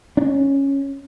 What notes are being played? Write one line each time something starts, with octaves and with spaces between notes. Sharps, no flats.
C#4 D4